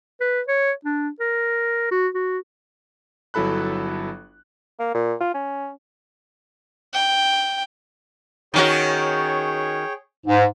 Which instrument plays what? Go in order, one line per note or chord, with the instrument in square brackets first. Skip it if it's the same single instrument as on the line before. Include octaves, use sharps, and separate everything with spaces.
[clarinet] B4
C#5
D4
A#4
F#4
F#4
[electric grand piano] G1 F#3 E4 A4 B5 F#6
[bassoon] A#3
A#2
F4
C#4
[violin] G5
[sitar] D#3 C#4 F#4 [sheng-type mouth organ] G#4 C#5 G5
[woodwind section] G#2